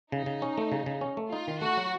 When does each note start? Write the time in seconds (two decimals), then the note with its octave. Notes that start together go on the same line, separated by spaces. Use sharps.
0.12 C#3 D#4
0.26 C#3
0.42 C#4
0.58 A3
0.72 C#3
0.86 C#3
1.01 C#4
1.17 A3
1.31 D#4 F4
1.48 D#3
1.61 A3 F#4
1.77 F#3